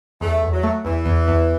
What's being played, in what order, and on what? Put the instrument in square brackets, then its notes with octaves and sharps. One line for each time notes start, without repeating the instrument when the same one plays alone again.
[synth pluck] E2 [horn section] A3
[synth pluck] E2
[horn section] F#3
[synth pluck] A3
[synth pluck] E2 [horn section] E3
[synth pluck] E2
E2